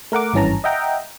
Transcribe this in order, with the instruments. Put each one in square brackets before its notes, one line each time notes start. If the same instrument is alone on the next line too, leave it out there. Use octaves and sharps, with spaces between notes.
[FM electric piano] A3 A#4 F#5 D6
G#1 G2 E3 C#4 A5 A#5
D#5 E5 F#5 G5 A#5